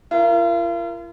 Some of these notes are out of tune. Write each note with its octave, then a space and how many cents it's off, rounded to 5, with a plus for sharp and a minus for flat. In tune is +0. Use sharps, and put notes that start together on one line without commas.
F4 -45 A#4 +0